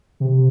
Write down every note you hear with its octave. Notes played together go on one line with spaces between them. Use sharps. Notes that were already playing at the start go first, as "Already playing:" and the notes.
C3